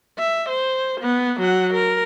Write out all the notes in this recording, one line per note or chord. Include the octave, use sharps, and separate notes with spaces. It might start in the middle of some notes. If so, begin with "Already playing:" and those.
E5
C5
B3
F#3 F#5
A#4